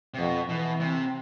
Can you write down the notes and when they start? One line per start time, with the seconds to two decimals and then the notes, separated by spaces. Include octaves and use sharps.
0.14 C3
0.18 F2 B2
0.49 B2 E3
0.81 C3